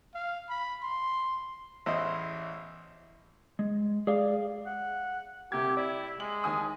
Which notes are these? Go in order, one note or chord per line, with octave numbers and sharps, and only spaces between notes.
F5
B5
C6
A1 E2 E4 C5 D#5
G#3
G#3 G#4 D5 F5
F#5
C2 C3 G4 G#6
E4 D5
G#3 F#7
D#2 G#5 D#6